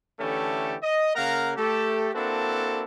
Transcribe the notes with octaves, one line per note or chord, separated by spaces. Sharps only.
D3 E3 A3 C#4 G4 A4
D#5
C#3 A#3 A#4 F5 F#5 A#5
A3 G4 A4
A#3 C4 D4 E4 F#4 A4